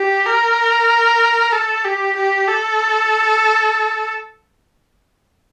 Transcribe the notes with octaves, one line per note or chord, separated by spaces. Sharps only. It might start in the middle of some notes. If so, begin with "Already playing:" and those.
Already playing: G4
A#4
A4
G4
G4
A4